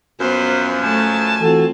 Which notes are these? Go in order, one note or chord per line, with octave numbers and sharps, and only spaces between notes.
F#2 F3 B3 B4 C5
A3 G#5 A5
E3 C4 F4 F#4 A4